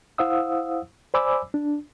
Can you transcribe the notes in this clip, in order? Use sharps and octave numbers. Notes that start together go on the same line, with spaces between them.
E4 C5 F5 F#5 D#6 E6
C5 D5 G#5 B5 D6 E6
D4